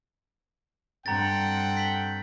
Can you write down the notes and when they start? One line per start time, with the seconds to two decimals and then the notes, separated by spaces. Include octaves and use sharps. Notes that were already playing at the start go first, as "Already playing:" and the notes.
1.06 G2 C4 A4 F#5 G5 A#5 A6
1.77 B6 F#7